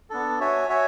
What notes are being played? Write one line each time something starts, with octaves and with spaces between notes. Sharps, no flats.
B3 D4 A4
F#4 C#5 E5 G#5
F#4 C#5 E5 G#5